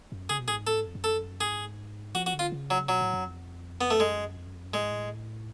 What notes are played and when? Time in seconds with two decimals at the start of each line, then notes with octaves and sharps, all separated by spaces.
0.12 F#2
0.29 C#3 G#4
0.39 B2
0.48 A2 G#4
0.57 G#2
0.67 A2 A4
0.75 G#2
0.86 F2
0.95 F#2
1.04 A4
1.41 G#2 G#4
2.15 F3 F#4
2.26 F#4
2.34 D3
2.39 F4
2.52 C#3
2.70 F#3
2.89 B2 F#3
3.01 A2
3.13 F#2
3.26 F2
3.81 B3
3.91 A3
3.99 F#2 G#3
4.37 F2
4.46 F#2
4.55 F2
4.65 F#2
4.74 A2 G#3
4.82 G#2
4.91 A2